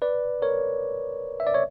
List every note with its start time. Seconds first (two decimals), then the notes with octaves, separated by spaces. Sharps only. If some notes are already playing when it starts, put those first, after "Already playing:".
0.02 B4 D5
0.42 A#4 C#5
1.40 E5
1.47 D5
1.54 C#5